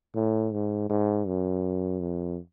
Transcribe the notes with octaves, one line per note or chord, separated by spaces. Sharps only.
A2
G#2
G#2
F#2
F2